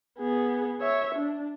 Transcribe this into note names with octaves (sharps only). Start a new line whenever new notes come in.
B3 G#4
C#5 E5
D4